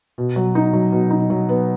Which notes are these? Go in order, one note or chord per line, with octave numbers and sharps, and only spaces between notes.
B2
F#3
D#4
F#3
B2
D#4
F#3
B3